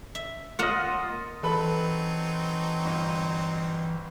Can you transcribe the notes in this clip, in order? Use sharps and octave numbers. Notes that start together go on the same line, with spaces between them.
E5
A#3 F4 D#5 F#5
E3 F#3 C4 D#4 A4 B4 B5
G1